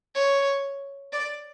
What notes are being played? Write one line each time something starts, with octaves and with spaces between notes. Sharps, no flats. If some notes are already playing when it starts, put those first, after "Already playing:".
C#5
D5